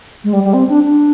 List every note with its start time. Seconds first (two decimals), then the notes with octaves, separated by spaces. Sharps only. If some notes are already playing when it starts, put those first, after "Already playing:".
0.24 G#3
0.33 G3
0.44 G3
0.54 C4
0.69 D4
0.84 D4